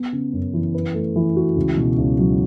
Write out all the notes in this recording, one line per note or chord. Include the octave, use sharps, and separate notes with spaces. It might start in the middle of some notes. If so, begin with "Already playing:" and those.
Already playing: B3
C#3
F#2
E3
B4
A3
E3
F#4
C#2
B2
C#2
F#3